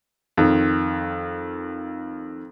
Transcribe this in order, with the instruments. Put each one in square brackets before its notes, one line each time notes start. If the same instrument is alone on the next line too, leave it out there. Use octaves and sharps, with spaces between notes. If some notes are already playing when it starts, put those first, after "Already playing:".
[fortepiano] F2 D#3